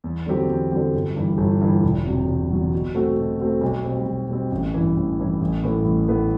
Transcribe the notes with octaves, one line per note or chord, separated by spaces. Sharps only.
E2
D3 F#3 C4 G4
E2
D3 F#3 C4 G4
G1
G2 E3
G1
G2 E3
E1
E2 C3 F#3
E1
E2 C3 F#3
B2
A3 C4 F#4
B2
A3 C4 F#4
B1
B2 G3 C4
B1
B2 G3 C4
A1
G2 E3
A1
G2 E3
A1
A2 E3 B3
A1
A2 E3 B3